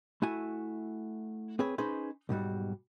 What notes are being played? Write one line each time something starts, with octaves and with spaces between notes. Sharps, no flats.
A3 E4 F#4 G#5
C4 G#4 B4 C#5
C#4 D#4 G#4 B4 C5
B1 G#2 G3 F#4